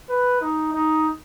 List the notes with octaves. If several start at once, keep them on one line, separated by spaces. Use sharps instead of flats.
B4
D#4
D#4